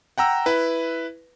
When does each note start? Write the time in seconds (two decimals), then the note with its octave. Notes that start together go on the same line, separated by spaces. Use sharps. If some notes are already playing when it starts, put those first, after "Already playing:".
0.18 F#5 G5 A#5 E6
0.46 E4 B4